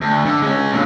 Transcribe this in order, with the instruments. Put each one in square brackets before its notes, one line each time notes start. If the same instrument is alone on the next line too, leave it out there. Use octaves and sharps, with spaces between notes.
[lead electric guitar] D2
D3
G#3 C#4
A#2 D3